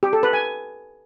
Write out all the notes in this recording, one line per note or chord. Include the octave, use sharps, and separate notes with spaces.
G4
A4
B4
G#5